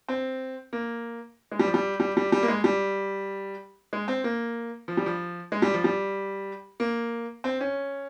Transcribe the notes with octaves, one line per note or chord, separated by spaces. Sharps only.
C4
A#3
G#3
G3
F3
G3
G3
G3
G3
A#3
G#3
G3
G#3
C4
A#3
F3
G3
F3
G#3
G3
F3
G3
A#3
C4
C#4